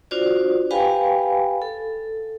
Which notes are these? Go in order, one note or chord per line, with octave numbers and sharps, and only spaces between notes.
D4 F4 F#4 C5 D5
G4 B4 F5 G5 G#5 B5
A4